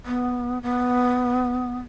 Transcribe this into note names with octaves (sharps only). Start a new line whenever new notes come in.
B3
B3